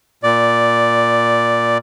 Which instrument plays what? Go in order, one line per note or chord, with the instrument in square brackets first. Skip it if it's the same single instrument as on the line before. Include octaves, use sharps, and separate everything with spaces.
[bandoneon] A#2 D5